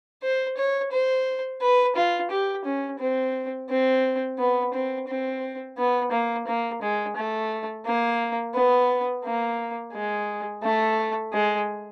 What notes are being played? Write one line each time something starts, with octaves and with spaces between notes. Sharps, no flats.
C5
C#5
C5
B4
F4
G4
C#4
C4
C4
B3
C4
C4
B3
A#3
A#3
G#3
A3
A#3
B3
A#3
G#3
A3
G#3